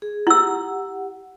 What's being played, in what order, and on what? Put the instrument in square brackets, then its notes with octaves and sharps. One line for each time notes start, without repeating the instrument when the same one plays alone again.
[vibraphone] G#4
[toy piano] E4 E6 [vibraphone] G4 F#5